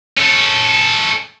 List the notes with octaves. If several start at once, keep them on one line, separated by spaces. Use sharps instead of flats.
C#4 A4